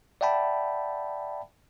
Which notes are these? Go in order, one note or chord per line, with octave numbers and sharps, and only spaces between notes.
D5 E5 F#5 G5 A5 B5